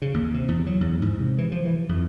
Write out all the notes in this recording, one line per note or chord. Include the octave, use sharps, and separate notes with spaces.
C#3
D#2
C3
E2
F#3
E2
G#2
C3
E3
F3
E3
F2